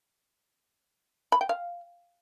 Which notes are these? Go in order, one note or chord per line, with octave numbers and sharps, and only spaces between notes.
B5
G5
F5